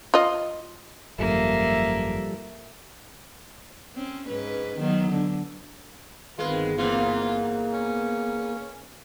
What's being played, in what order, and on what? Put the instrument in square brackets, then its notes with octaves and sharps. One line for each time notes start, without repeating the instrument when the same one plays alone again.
[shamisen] F4 D#5
[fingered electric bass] G#1 F#2 [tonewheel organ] F3 G3 A4 [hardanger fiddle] A#3 E5
[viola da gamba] C4 C#4
G#2 C#4 B4
D#3 F#3 B3
D3
[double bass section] G1 B3 C4 [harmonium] D#3 B4 [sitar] G#3 [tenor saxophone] F4
[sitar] G#2 E3 [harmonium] A#3 [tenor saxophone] F4
[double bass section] B3 [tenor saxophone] C#4